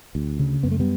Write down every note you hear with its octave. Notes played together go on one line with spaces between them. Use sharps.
D2
C#3
F#2 B3
A3
G3 B3